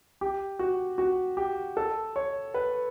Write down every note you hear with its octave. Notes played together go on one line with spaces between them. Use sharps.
G4
F#4
F#4
G4
A4
C#5
B4